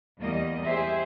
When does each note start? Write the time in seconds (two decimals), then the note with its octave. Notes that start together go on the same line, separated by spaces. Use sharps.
0.19 E2 G3 A#3 D#5
0.64 G4 G#4 C5 E5